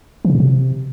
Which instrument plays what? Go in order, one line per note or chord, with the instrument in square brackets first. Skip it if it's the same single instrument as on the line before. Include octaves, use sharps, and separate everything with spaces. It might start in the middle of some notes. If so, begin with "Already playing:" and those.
[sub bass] E3
C3
A#2
C3